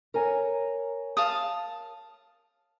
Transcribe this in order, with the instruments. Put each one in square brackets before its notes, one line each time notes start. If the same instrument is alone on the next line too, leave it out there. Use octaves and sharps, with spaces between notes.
[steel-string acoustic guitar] A#4 C#5 G#5
[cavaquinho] F5 A5 D#6